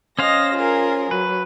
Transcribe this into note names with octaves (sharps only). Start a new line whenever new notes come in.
C#4 C5 D#5 F5 A#6
F4 G#4 A#4
F#3 B4